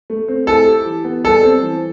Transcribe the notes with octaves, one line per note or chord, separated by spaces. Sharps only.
A3
C4
E4 A4
G4
E3
B3
G3 A4
C4
E3